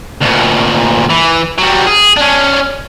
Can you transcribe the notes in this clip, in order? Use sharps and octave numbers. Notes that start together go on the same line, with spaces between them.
D2 A#2
E3
F#3 G3
G#4
C#4 D4